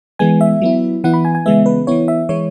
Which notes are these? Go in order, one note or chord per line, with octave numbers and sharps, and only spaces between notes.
E3 G#3 B3 G#5
E5
F#3 B3 E4
E3 B3 E4 F#5
B5
G#5
G#5
C#3 E3 G#3 B3 E5
B4
E3 B3 E4 C#5
E5
E3 G#3 E4 C#5